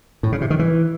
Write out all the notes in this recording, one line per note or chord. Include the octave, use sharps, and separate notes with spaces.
A2
C#3
C3
D#3
E3